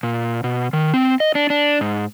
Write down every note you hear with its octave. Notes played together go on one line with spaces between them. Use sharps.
A#2
B2
D#3
C4
D#5
D4
D4
G#2